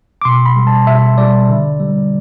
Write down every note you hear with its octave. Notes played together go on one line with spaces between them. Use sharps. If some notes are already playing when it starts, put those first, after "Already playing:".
D6
B2 C6
B5
G3
A5
B2 E5
G3 D5
D3
G3